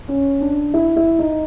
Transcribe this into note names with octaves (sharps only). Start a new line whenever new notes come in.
C#4
D4
E4
E4
D#4